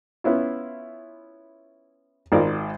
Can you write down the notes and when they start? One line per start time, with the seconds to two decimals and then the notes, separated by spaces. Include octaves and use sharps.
0.24 B3 C#4 E4 F4
2.32 G#1 F4 A#4 D5